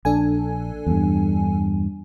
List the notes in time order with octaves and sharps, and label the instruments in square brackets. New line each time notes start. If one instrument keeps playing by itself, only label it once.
[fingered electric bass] A#1 [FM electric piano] D4 A4 G#5
[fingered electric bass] E2 G2